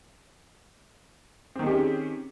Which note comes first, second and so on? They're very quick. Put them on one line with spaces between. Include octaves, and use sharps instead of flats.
C4 D#3 G#4 G4 C#4